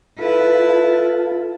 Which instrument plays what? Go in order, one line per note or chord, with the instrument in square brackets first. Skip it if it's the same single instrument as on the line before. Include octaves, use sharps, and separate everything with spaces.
[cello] E4 B4 [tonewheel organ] F4 A4